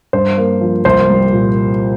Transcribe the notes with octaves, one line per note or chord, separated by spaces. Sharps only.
G2 C5
A#3
F3
C2 C5
G3
A#2